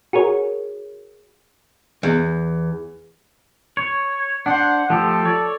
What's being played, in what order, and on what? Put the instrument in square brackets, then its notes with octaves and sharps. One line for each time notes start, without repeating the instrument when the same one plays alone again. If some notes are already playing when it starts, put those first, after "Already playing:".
[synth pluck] F#4 G#4 A#4 C#5
[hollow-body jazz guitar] E2
[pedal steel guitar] C#5
[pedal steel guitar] D4 C5 [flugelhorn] F#5
[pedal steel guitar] F3 A3 G4 [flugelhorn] A4
[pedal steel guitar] C#5 D5